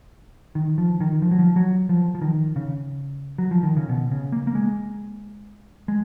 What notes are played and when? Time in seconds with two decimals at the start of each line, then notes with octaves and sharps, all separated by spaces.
0.55 D#3
0.78 F3
1.00 D#3
1.22 F3
1.31 F#3
1.39 F3
1.56 F#3
1.89 F3
2.15 F3
2.21 D#3
2.56 C#3
3.38 F#3
3.51 F3
3.63 D#3
3.76 C#3
3.89 B2
4.11 C#3
4.32 A#3
4.47 A#3
4.55 G#3
5.88 G#3